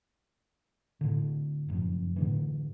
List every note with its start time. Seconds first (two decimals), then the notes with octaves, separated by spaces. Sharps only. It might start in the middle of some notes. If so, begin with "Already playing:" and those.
1.01 A2 D3
1.69 F#1 F2
2.16 A2 D3 E3